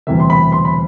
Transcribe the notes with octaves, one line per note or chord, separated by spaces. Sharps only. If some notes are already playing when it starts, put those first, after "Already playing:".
E1 D2 C3 E3 G3 E5
C6
B5
C6
B5